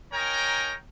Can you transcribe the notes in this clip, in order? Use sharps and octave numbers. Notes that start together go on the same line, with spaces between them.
D#4 A#4 C#5 G5 G#5 A#5